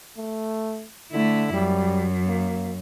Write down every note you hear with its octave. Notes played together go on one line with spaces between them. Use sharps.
A3
D3 A3 E4
F#2 G3
A#3